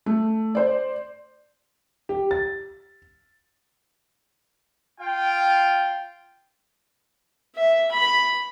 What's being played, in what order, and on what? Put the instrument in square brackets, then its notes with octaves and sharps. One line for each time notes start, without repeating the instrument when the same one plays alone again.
[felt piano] A3
C5 D5
[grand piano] G4
A6
[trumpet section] F4 F5 G5
[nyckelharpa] E5
B5